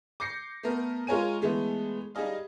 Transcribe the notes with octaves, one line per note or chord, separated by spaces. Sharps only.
D6 G6 A#6 C7 C#7
A3 B3 A#4
G#3 F4 A#4 C#5 G#5 D#7
E3 G#3 A3 B3
G3 D#4 G#4 D#5 F5